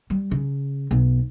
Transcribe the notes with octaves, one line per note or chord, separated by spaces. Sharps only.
G3
C#3
B1